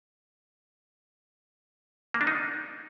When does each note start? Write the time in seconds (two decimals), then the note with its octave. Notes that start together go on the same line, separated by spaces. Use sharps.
2.14 A#3
2.21 D4
2.27 D#4